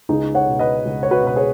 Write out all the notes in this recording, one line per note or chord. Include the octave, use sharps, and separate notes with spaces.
C#2 D#4 G#4
C#5 F#5
B2
B4 D#5
C#2
C#5
F#4 B4
B2 B4
G#4 C#5